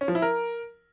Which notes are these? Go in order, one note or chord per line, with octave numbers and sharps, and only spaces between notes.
C#4
F3
E4
A#4